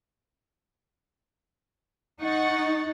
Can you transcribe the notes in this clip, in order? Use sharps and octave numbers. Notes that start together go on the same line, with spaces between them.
D#4 F#5 C#6 A6